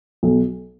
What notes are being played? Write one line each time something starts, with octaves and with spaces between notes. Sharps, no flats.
B1